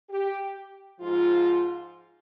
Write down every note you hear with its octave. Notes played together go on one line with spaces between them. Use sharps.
G4
G#2 F3 F4